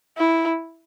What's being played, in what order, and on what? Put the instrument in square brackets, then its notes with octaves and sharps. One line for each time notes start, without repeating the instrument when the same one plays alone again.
[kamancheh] E4